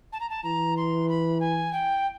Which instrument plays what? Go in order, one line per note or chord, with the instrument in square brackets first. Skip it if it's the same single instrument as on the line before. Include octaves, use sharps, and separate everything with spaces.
[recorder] A5
A#5
A5
[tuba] E3 [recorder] A#5
[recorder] C6
B5
G#5
G5